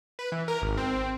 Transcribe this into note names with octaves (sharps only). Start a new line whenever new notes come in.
B4
E3
A#4
G#1
C4